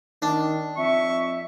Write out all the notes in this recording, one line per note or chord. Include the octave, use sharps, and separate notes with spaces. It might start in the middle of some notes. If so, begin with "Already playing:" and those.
D#3 D4
F2 E5 C#6